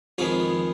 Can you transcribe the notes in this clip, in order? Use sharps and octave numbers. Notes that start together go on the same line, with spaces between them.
F2 D#3 G#3 B3 F4 G#4